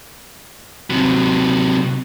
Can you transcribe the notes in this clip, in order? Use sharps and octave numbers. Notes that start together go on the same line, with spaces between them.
C3 F#3